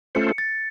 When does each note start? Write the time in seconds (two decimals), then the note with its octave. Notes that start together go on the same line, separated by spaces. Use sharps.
0.15 A3 C#4 F4 A4 C5 C#7
0.38 A6